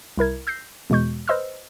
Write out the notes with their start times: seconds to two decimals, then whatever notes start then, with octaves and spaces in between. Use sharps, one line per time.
0.18 C2 E4 A#4 G#6
0.47 E6 G6 A#6 C7
0.90 E2 B2 G#3 C#6 G6
1.28 B4 C5 D#5 C6 E6 F6